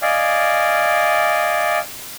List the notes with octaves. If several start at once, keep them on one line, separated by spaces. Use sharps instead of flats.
D5 D#5 F5 G#5